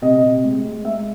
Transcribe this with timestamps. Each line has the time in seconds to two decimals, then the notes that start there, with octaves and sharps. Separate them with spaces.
0.02 C3 D#5
0.23 C3
0.44 G#3
0.64 G#3
0.85 G#3 E5